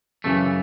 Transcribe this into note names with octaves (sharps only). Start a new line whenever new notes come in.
F#2 C#3 E3 A3